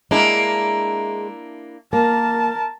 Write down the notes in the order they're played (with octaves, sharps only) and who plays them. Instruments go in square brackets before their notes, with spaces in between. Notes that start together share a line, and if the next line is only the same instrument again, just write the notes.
[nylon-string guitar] G#3 D#5 [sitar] A#3 D4 E4
[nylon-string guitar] A#3 [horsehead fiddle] A#4 A5